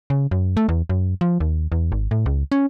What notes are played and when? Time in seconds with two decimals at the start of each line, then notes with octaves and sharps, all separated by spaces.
0.10 C#3
0.31 F#2
0.57 A3
0.69 E2
0.90 F#2
1.21 F3
1.40 D#2
1.72 E2
1.92 G#1
2.11 A2
2.26 C#2
2.52 C#4